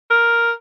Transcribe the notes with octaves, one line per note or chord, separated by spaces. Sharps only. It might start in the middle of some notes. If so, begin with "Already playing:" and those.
A#4